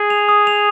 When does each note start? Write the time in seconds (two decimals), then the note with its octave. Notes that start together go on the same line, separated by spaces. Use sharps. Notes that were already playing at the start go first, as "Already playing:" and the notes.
Already playing: G#4
0.10 F7
0.29 D#6
0.47 F7